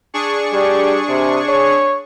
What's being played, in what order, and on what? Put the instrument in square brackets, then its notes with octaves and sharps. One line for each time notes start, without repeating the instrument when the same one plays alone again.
[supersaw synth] D4 G#4 C#6
[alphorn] G3
C3
C#5